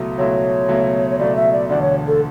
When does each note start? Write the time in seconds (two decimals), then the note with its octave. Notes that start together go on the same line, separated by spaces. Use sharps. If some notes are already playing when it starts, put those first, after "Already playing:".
Already playing: C#2 B2 F#3 A3 E4
0.18 C#2 B2 F#3 A3 E4 C#5
0.68 C#2 B2 F#3 A3 E4
1.10 C#5
1.19 C#2 B2 F#3 A3 E4 D5
1.36 E5
1.53 D5
1.70 E1 D2 D3 D5
1.82 C#5
2.07 A4